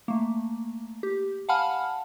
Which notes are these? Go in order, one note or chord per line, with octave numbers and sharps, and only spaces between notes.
A3 A#3
G4
F5 F#5 G#5 A5 B5 F6